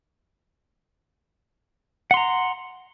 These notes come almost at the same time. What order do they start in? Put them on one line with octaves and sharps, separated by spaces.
F#5 C6 A#5